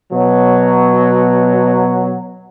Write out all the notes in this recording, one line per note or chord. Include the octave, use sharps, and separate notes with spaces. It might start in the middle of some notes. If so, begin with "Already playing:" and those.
B2 F#3